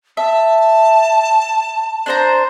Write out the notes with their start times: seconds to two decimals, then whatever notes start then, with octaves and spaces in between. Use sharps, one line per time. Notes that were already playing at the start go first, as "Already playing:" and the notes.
0.17 E5 A5
2.06 D4 C5 A#5